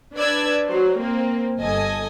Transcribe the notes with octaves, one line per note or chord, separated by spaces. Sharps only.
D4 B4 D5 E6 G#6
F#3 C5
A#3 C4
G1 A4 D#5 G#5 D#6